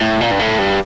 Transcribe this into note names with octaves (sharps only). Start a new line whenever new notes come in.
A2
A#2
G2
A2
G2